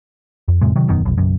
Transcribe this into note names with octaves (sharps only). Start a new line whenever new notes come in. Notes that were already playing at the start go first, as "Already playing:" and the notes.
F2
F2 A2 C3 G#3
C3 D#3 F#3
E1 F#2 B2 D#3
F1 B1
F#1 B1 F#2